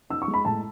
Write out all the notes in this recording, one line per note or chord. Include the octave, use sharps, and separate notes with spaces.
D#4 E6
C#6
G#3
B5
A2 A5